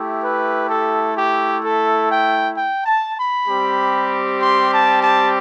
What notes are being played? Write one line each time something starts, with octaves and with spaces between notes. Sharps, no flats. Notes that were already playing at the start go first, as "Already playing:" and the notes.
Already playing: A3 E4 G4
B4
A4
G4
A4
G5
G5
A5
B5
G3 C4 G4
C6
A5
A5